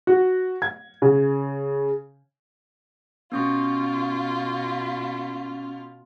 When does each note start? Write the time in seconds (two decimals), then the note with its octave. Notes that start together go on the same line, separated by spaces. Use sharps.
0.07 F#4
0.62 G#6
1.02 C#3
3.32 B2 B3 C#4 F4 C#6